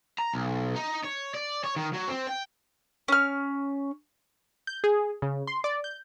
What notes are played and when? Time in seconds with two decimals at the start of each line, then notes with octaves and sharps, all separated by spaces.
0.19 A#5
0.34 B1
0.76 D#4
1.04 C#5
1.34 D5
1.64 C#5
1.76 D#3
1.94 F#3
2.08 C4
2.27 G5
3.08 C#4 F6
4.67 G6
4.84 G#4
5.22 C#3
5.47 C6
5.64 D5
5.84 G6